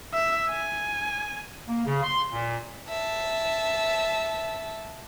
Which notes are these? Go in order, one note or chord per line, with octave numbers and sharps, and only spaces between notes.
E5
G#5
A#3
C#3
C6
A#2
E5 A5